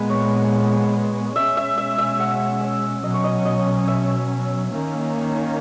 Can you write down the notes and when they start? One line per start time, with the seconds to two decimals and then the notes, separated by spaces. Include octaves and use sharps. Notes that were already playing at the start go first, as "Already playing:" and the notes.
Already playing: A#2 G#3 B3 B4
0.10 C#5
1.35 B2 G#3 C#4 E5
1.57 E5
1.78 E5
1.98 E5
2.20 F#5
2.61 E5
3.03 B2 F#3 C#4 D#5
3.14 C#5
3.24 D#5
3.46 D#5
3.88 E5
4.71 D#3 A#3 C#4